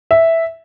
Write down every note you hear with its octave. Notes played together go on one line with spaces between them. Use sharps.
E5